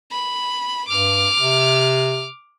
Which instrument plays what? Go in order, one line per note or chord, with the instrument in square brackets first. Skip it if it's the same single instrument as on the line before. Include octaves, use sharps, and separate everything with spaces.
[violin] B5
[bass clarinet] G2 [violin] D6 F6
[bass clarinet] C3